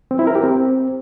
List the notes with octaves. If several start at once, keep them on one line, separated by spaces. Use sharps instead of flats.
C4
E4
A#4
G4
C4